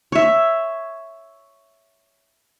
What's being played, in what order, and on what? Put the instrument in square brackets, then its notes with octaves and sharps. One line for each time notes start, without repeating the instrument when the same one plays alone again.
[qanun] C#5 E5